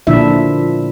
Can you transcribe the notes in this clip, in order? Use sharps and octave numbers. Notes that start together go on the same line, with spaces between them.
A#2 D3 F3 D4 E4 E5